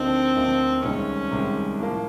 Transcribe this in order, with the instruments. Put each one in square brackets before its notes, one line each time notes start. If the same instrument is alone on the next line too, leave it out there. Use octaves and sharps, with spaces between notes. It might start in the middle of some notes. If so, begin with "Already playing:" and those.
Already playing: [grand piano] D2 D3 F3 A#3 D#4 [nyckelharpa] C4
[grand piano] D2 D3 F3 A#3 D#4
[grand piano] C2 C3 D#3 G#3 [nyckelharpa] C#4
[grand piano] C2 C3 D#3 G#3
A2 F3 A#3